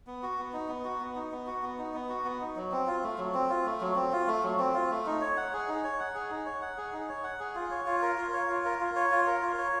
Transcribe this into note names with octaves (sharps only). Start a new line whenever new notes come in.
B3
F#4
B3
D#4
B3
F#4
B3
D#4
B3
F#4
B3
D#4
B3
F#4
B3
D#4
F#3
C4
F4
A3
F#3
C4
F4
A3
F#3
C4
F4
A3
F#3
C4
F4
A3
D#4
C#5
F#5
G#4
D#4
C#5
F#5
G#4
D#4
C#5
F#5
G#4
D#4
C#5
F#5
G#4
F4
C#5
F4
A#4
F4
C#5
F4
A#4
F4
C#5
F4
A#4
F4
C#5